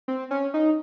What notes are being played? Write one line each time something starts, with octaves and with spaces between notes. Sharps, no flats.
C4
C#4
D#4